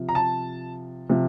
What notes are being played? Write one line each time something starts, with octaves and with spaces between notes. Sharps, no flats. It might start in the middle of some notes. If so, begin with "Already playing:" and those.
Already playing: C3 F3
A#5
A5
C3 F3